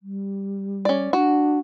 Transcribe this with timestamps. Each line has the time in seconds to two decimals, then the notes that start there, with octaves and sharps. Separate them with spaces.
0.03 G3
0.85 C#4 D5
1.13 D4 F#4